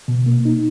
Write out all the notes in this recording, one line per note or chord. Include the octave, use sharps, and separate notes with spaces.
B2
A#3
D#4